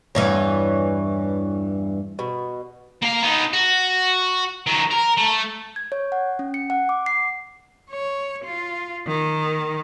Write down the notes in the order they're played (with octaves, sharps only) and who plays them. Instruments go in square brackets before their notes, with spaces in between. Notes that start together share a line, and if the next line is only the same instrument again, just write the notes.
[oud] E2 G2 E3 [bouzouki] C#5
[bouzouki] B2
[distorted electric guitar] A#3 F5
B3 D#4
F#4
D#3 F#3
A#4
A3
[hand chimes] G#6
C#5
F#5
C#4
C#7
F#5
D6
C7
[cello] C#5
F4
D#3